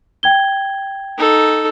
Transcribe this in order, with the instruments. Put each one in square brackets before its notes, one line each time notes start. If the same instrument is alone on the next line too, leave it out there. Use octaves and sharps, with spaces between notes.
[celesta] G5 G#6 G7
[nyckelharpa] D#4 A4